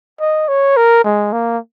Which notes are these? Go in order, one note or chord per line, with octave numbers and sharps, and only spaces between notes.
D#5
C#5
A#4
G#3
A#3